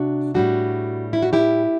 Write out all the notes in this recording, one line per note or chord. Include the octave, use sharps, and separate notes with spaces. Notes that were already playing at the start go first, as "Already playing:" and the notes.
Already playing: C3 D4 F#4
A2 G3 D4 F#4
E4
F#4
E4 G4